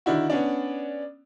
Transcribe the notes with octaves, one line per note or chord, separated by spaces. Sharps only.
D3 D#3 D4 E4 F#4
B3 C#4 D4